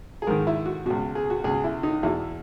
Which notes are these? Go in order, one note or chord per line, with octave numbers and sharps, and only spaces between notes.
G#4
G#2 D#3 A#4
E4
F#4
C#2 B2 F#4
G#4
F#4
C#2 B2 G#4
E4
D#4
E2 B2 E4